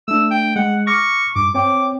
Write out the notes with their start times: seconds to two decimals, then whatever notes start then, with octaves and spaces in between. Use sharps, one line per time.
0.08 A3 D4 E6
0.31 G5
0.56 G#3 F#5
0.87 C#6 D6 F6 A#6
1.36 G2 D6
1.54 C4 C#5 G5 D6